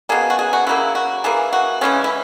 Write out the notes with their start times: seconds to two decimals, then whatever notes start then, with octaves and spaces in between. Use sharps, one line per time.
0.09 B2 A#3 G#4
0.30 F#4
0.39 G#4
0.53 F#4
0.67 C#3 F#3 A#3 E4
0.95 F#4
1.24 E3 A#3 G#4
1.53 F#4
1.81 C#3 E3 G#3 C#4
2.04 E4